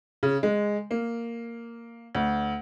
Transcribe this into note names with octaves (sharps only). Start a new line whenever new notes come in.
C#3
G#3
A#3
D2